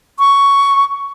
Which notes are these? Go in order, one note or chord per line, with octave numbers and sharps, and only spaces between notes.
C#6